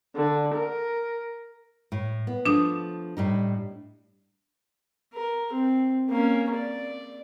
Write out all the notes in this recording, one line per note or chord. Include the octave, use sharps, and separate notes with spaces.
D3
A#4
A2
B3
F3 A3 D4 D#6
A2 G3 D#4
A#4
C4
A#3 C#4
D5